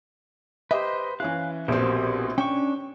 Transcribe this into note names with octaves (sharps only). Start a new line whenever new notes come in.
G4 B4 C5 D#5
E3 C#4 E4 F5 F#6
A#1 B2 C4 G4 A#4 C5
C#4 D4 G5 C#6